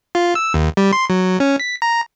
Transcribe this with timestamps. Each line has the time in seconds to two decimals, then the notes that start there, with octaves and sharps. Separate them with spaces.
0.15 F4
0.35 E6
0.54 D#2
0.77 G3
0.93 C6
1.10 F#3
1.40 C#4
1.60 B6
1.82 A#5